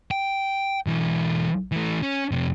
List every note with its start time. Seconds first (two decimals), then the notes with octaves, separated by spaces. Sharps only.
0.11 G5
0.87 B1 E3
1.72 E3 A3
2.03 C#4
2.32 F2 C3